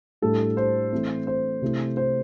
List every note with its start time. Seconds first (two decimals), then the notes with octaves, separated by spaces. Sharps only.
0.22 A2 G3 D4 A4
0.57 C5
0.93 E3 A3 C4 E4
1.27 C5
1.62 C3 A3 E4
1.97 C5